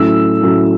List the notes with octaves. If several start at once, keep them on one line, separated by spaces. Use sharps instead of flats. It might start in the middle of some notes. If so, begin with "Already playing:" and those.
Already playing: A2 F#3 A3 C#4 E6
A2 F#3 A3 C#4